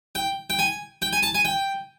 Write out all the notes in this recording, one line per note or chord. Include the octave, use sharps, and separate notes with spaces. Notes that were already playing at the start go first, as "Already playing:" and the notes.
G5
G5
G#5
G5
G#5
A5
G#5
G5